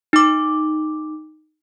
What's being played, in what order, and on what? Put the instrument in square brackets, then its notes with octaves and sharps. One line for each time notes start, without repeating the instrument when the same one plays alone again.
[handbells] D#4 D6